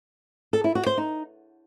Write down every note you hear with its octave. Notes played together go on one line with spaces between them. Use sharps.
A4
E4
F#4
C5
D#4